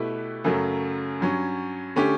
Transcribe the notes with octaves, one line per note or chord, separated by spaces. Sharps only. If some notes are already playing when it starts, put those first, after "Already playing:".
Already playing: B2 A3 E4 G4 B4
F#2 C#3 F#3 A3
G2 F#3 C#4
D3 A3 C#4 G4